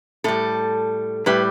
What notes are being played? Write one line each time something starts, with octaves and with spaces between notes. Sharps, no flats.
A2 G3 A4
A2 G3 B4